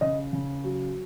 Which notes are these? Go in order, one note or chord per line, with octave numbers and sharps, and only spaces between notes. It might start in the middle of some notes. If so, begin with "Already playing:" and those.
C#3 D#5
C#3
F#3